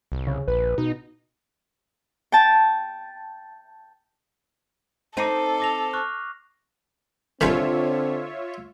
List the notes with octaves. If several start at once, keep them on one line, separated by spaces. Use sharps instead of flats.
C2
C#3
A#1 B4
B2 D#4
G5 A5
C4 D#4 A4 D6 C7 D#7
D6 A#6 F7
C#6 F6 F#6
C2 D3 D#3 C4 F4 C#5 E5